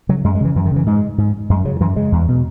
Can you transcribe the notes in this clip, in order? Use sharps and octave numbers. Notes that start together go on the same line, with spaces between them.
C#3 F#3
F#2 G#3
G#3
C#3 E3
F#2 E3
D#3
C#3 E3
G#2 G#3
G#2
F#2 G#3
C#3 F#3
F#2 E3
C#3 G#3
E2
B2